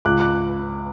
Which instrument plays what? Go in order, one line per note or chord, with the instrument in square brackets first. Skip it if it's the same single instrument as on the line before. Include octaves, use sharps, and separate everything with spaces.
[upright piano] C#2 [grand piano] D6 F#6
[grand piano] D6 F#6